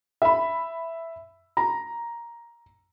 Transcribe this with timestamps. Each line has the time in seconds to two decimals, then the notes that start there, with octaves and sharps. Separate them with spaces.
0.22 E5 B5
1.57 A#5